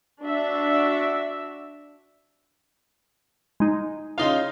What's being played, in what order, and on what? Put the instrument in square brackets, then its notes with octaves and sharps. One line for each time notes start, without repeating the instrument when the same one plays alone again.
[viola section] D4 F#4 E5
[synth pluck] G#3 D#4
[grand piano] C#3 D#4 F4 [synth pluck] F5 C6